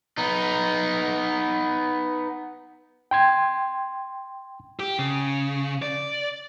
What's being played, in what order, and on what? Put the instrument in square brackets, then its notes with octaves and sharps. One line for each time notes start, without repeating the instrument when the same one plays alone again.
[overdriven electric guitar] B3 D#4
[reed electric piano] G5 C6 G#6
[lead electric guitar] G4
C#3
D5